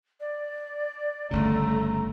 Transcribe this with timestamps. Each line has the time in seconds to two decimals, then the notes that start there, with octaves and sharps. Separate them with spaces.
0.20 D5
1.31 G1 C#3 A3 A#5